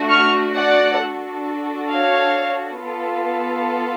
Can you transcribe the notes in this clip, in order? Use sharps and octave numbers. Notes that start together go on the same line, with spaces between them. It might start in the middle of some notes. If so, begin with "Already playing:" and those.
Already playing: A3 D4 F#4
C#6 F6
D5 F#5
D4 F#4 A4
C#5 F5
B3 F4 A4